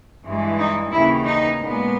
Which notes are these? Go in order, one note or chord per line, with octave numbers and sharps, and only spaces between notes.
G2 E3 G#3
D#4
D#2 C#3 E3 E4
D#4
A#2 G#3 B3